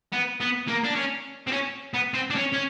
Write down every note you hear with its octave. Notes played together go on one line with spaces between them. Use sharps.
B3
B3
A#3
D4
C#4
C4
C#4
B3
C4
D4
C#4
C#4